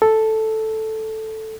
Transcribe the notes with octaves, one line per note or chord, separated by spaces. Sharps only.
A4